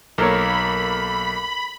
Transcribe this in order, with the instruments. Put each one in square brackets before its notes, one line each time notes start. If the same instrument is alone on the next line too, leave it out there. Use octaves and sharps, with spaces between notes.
[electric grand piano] B1 A4 [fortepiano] A#3 A#4 C#5 [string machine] B5